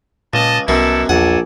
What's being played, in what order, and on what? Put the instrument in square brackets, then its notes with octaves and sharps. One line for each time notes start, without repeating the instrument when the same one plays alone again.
[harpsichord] C#2 [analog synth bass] A#2 [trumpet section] D#5 A5
[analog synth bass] C2 [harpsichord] F#2 B2 F#3 [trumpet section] E4 G4 A4
[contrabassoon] A#1 [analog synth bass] E2 [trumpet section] A4 D5 G#5 [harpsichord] F#5